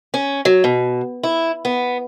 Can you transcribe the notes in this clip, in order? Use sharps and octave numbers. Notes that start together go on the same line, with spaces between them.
C#4
F#3
B2
E4
B3